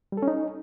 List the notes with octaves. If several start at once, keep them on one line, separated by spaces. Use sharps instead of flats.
G3
A4
C#4
D#4